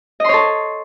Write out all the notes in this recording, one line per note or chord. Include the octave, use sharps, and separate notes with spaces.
A4 C#5 D#5 C6